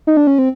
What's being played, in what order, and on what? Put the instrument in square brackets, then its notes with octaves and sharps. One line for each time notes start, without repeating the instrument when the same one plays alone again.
[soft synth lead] D#4
D4
C#4
C4